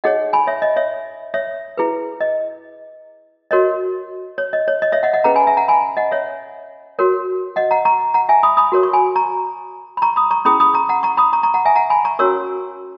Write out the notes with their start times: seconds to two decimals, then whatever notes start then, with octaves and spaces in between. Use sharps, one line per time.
0.04 D#4 G#4 C#5 D#5 F#5
0.33 G#5 B5
0.47 C#5 E5
0.62 D#5
0.76 C#5 E5
1.34 C#5 E5
1.77 E4 G#4 B4
2.21 D#5
3.51 F#4 A#4 C#5 D#5
4.38 C#5
4.53 D#5
4.68 C#5
4.82 D#5
4.92 C#5 E5
5.03 D#5 F#5
5.13 D#5 F#5
5.24 C#4 G#4 B4 F#5 A#5
5.35 G#5 B5
5.47 E5 G#5
5.57 F#5 A#5
5.68 G#5 B5
5.97 D#5 F#5
6.11 C#5 E5
6.99 F#4 A#4 C#5
7.56 D#5 F#5
7.71 F#5 A#5
7.85 A#5 C#6
8.14 F#5 A#5
8.29 E5 G#5
8.43 B5 D#6
8.57 B5 D#6
8.72 F#4 A#4 C#5
8.83 C#6
8.93 G#5 B5
9.16 A#5 C#6
9.97 B5
10.02 A#5 C#6
10.16 B5 D#6
10.31 A#5 C#6
10.45 C#4 E4 G#4 B5 D#6
10.60 B5 D#6
10.74 A#5 C#6
10.89 F#5 A#5
11.03 A#5 C#6
11.17 B5 D#6
11.33 A#5 C#6
11.43 A#5 C#6
11.54 F#5 A#5
11.65 E5 G#5
11.76 F#5 A#5
11.90 G#5 B5
12.05 A#5 C#6
12.19 C#4 F#4 A#4 C#5 C#6 E6